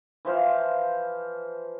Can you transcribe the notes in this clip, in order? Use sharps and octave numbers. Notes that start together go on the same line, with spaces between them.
E3 F3 C5 F5